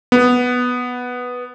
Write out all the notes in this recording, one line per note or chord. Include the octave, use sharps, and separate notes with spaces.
B3